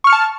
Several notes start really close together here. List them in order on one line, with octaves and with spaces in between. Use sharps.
C#6 F6 C#7 A5